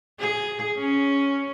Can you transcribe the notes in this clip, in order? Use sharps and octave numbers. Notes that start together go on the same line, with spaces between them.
G#4
C#4